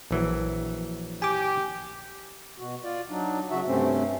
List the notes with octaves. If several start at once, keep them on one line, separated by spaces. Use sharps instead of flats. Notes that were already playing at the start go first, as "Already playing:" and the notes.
A#1 E3 F#3
G4 G#5 D6
B2 F#4
F4 D5
F#3 D4 D#4
C#3 F#3 F#4 E5
G2 C3 A3 C4 C#4